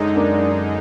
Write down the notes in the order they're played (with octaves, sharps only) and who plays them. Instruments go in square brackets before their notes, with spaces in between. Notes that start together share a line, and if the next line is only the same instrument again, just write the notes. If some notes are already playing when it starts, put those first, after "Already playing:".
Already playing: [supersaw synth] F#2 D3 G#3 D#4
[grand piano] A#3 D4